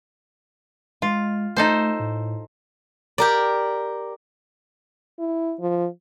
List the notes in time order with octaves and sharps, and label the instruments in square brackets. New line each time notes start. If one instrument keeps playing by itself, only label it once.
[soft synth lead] G#3 [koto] F4
[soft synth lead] A3 [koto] D#4 A4 C5
[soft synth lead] A2
[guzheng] G4 A#4 D5
[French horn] E4
F3